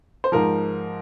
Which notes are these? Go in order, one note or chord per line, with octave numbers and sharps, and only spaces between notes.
C5
G#2 F3 A#4